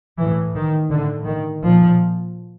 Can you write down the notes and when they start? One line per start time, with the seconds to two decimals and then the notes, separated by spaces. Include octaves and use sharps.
0.19 A2 E3
0.56 D#3
0.90 A2 D3
1.27 D#3
1.63 A#2 F3